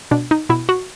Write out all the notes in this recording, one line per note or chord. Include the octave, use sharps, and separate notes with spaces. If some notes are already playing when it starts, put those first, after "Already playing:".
B2 D4
D#4
B2 E4
F#4